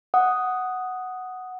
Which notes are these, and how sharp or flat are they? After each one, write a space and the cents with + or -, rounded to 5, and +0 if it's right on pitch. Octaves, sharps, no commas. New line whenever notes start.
F#5 +0 D#6 +0